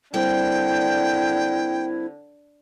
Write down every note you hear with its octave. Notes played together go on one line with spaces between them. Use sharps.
D3 G3 A#3 C4 E4 G5